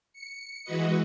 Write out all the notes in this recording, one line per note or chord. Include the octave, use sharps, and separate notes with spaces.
C#7
E3 G#3 F#4 B4 D#5